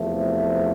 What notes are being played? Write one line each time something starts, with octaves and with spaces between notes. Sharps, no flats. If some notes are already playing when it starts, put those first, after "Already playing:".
Already playing: E2 C3 F3 A3